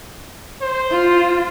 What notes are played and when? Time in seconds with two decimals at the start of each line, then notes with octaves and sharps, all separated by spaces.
0.61 C5
0.91 F4